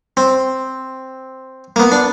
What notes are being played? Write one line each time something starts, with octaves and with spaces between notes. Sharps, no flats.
C4
A#3
B3
D4